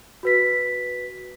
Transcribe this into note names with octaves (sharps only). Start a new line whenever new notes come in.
F#4 B4 B6